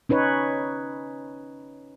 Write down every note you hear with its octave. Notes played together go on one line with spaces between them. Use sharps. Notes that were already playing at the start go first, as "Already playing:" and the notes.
C#4 D#4 B4 C#5